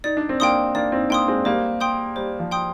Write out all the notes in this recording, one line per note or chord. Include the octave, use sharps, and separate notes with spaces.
D#4 D5
D4
C4
A#3 D4 G5 C6 D#6
A#3 D4 D5
C4 D#4
A#3 D4 G5 C6 D#6
G#3 C4
G3 A#3 C5
G5 C6 D#6 G6
G3 C5
F3
G5 C6 D#6 G6